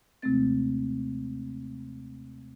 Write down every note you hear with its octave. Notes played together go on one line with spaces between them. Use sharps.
D#2 C3 G#3 A3 C4 A6